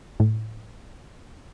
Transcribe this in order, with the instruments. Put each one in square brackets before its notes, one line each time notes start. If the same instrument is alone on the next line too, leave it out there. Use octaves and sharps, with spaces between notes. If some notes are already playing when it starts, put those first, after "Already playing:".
[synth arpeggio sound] A2